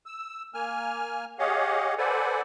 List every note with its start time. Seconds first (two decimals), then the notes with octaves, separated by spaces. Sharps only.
0.06 E6
0.54 A#3 G#5 F6
1.39 G4 G#4 C#5 D#5 F5 F#5
1.98 A4 B4 C5 D5 F#5 G#5